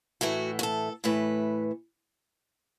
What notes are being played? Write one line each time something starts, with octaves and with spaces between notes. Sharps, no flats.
A2 E3 A3 F#4
F#4
A4
A2 E3 A3 B4